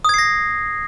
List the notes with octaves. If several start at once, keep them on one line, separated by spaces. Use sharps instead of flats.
D#6 G#6 A#6 C7